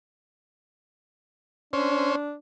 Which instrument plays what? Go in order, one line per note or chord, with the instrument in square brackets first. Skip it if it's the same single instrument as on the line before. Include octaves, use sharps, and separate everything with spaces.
[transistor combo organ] C#4 C5 [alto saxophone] D4